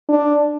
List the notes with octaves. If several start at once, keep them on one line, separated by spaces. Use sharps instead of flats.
D4